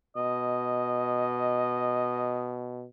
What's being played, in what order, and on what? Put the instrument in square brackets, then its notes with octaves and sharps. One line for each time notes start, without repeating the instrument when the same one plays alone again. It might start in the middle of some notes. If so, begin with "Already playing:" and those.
[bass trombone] B2 [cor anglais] D#5